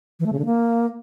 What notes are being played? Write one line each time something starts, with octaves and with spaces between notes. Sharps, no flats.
E3
A3
C#3
D3
A#3